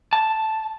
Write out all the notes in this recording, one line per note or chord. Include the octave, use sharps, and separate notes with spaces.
A5